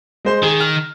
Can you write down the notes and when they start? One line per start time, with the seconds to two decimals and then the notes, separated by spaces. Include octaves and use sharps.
0.25 G#3 C5 C6
0.43 D#3 G#4
0.60 F6